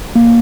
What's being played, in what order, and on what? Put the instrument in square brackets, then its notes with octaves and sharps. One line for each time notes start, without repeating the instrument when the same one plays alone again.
[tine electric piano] A#3